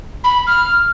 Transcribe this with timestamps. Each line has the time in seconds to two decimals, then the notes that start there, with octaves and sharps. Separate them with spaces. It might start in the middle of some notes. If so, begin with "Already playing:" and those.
0.24 B5
0.47 F6